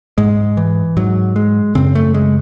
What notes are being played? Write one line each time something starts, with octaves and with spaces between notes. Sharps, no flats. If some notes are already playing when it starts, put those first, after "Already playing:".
G#2 G#3
E3
G#2 F#3
G#3
F#2 C#3 C4
A3
G#3